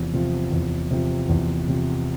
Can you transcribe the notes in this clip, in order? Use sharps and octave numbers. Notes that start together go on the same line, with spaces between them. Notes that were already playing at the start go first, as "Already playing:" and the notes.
Already playing: E2 C3 F3
C3 F3
E2
C3 F3
E2
C3 F3